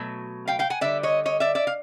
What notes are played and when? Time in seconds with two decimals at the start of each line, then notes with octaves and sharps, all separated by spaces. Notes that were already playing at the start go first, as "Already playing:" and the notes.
Already playing: B2 F#3 A3
0.48 F5 G5
0.59 F5 G5
0.70 F#5 G#5
0.81 D3 G3 D5 E5
1.03 C#5 D#5
1.26 C#5 D#5
1.40 D5 E5
1.55 D5 E5
1.67 F5